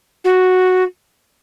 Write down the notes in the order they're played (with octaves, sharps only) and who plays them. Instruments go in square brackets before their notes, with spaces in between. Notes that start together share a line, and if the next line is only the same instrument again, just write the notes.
[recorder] F#4